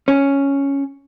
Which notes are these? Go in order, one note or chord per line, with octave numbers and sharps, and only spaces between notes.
C#4